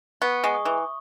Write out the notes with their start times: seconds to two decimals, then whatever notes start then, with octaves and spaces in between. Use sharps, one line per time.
0.22 B3 C#6
0.44 G#3 C#6
0.54 D#6
0.65 E3